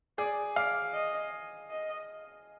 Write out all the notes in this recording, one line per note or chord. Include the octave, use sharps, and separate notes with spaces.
G#4 D5
D5 F5
D#5
D#5